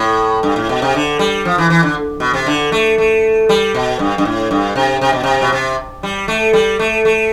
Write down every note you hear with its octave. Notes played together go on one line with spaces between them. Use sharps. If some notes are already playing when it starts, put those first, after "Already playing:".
Already playing: A2
G2
A2
B2
C3
D3
G3
F3
E3
E3
D3
B2
C3
D3
A3
A3
G3
B2
G2
G2
A2
G2
C3
C3
B2
C3
B2
C3
G3
A3
G3
A3
A3